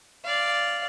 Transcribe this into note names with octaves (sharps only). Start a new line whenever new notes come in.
D5 F5